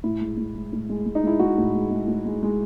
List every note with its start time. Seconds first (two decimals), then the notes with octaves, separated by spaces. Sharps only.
0.04 A2 E4
0.21 G#3
0.37 A2
0.55 G#3
0.73 A2
0.90 G#3
1.06 G#3
1.15 D#4
1.23 G#3 E4
1.40 G#3 F#4
1.58 A2
1.75 G#3
1.91 G#3
2.08 A2
2.26 G#3
2.43 G#3